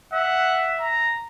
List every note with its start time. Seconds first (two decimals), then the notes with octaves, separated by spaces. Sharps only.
0.13 E5 F#5
0.80 A#5